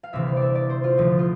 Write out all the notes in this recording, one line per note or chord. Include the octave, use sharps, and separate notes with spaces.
F5
D2 C3 E3 E5
F5
D5 E5
D5
C5
F4
D2 D3 F3
F4